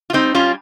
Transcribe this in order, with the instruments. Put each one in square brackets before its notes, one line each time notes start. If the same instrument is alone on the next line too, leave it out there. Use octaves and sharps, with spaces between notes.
[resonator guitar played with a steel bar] F4
G3 C4 D#4
G3 C#4 F4